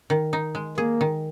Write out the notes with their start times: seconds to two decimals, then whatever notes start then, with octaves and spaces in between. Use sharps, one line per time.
0.10 D#3
0.33 D#4
0.55 G#3
0.77 A#3 G#4
1.01 D#3